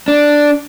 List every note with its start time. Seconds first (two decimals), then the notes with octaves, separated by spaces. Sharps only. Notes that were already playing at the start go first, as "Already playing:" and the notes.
0.08 D4